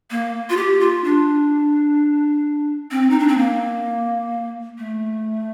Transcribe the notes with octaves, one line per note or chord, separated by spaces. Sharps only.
A#3
F4
G4
F4
D4
C4
D#4
D4
C4
A#3
A3